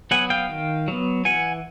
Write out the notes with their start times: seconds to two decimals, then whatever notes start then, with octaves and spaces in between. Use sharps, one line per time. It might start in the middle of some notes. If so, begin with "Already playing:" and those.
0.11 F#3 B3 F#5 G#5
0.30 F5 G5
0.49 D#3
0.88 F#3 B3
1.25 E3 F#5 G#5